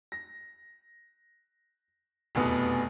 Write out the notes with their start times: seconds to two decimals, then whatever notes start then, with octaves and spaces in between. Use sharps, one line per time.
0.12 A#6
2.35 F1 E2 B2 B3